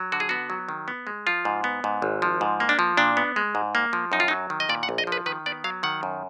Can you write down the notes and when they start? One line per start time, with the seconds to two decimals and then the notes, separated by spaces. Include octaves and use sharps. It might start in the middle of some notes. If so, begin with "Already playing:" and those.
Already playing: F#3
0.12 D3 F#4
0.20 G#4
0.29 B3 F#4
0.50 F#3
0.69 D#3
0.88 B3
1.07 G#3
1.27 F3 F4
1.45 G#2
1.64 B3
1.84 G#2
2.02 G#1
2.22 F3
2.41 G#2
2.60 A#3
2.69 D4
2.79 F3
2.97 A#2 D4
3.17 B3
3.36 G#3
3.55 G#2
3.75 A#3
3.93 F3
4.12 F#2 D#4
4.20 F4
4.28 F#3 D#4
4.50 D#3
4.60 D#5
4.69 A#2 D5
4.83 F#5
4.89 A#1
4.98 D#5
5.07 F3
5.12 B4
5.26 D#3 B4
5.46 B3 D5
5.64 F#3 F5
5.83 D#3 F#5
6.03 F#2